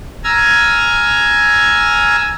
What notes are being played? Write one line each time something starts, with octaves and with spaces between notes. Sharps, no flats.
G#5 A#5 E6 F6 G#6